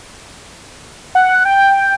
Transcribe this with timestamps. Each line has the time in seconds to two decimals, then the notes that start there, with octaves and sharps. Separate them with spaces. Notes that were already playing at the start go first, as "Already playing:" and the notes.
1.15 F#5
1.45 G5